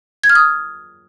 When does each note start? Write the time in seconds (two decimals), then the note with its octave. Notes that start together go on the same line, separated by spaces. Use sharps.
0.24 G#6
0.30 F6
0.35 D#6